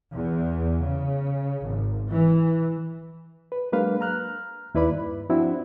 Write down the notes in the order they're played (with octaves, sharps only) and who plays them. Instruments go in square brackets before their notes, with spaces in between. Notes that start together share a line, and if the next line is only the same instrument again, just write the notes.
[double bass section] E2
C#3
G#1
E3
[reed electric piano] B4
F#3 G#3 A#3 D4 B4 F5
A#5 F6 F#6
D#2 E4 B4 D5 B5
G2
F3 C4 D4 E4 F#4